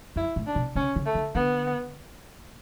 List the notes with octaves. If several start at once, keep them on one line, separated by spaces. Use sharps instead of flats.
F#2 E4
A2
D4
B2
C#3 C#4
C#3
A3
D3
D3 B3